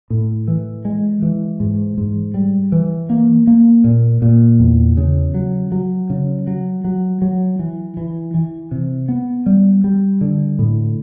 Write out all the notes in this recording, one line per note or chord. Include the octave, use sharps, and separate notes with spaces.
A2
E3
G#3
E3
G#2
G#2
G3
E3
A#3
A#3
A#2
A#2
E2
C#3
F#3
F#3
C#3
F#3
F#3
F#3
E3
E3
E3
C3
B3
G3
G3
D3
A2